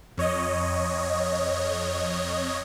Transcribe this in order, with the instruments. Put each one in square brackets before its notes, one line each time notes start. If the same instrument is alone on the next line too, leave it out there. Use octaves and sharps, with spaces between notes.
[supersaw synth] F2 C#5 D#5